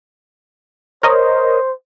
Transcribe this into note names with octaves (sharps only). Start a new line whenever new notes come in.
A#4 C5 C#5 D#5